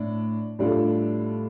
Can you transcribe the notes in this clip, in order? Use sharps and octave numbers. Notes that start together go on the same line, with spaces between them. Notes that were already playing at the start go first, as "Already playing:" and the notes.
Already playing: A2 D4
A2 G3 D4 F4 A4